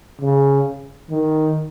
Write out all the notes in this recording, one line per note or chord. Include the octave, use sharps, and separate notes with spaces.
C#3
D#3